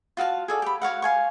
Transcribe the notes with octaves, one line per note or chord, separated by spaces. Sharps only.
F4 F#4 F5 A5
G#4 A4 D5
G4 B5
F#4 C#5 F5 F#5
F5 G#5 C#6